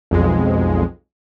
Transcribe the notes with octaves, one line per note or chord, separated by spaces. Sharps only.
B1 F2 G#3